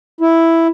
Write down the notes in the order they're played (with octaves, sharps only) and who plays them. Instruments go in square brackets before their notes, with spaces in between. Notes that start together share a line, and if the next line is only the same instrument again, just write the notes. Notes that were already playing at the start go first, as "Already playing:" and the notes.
[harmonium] E4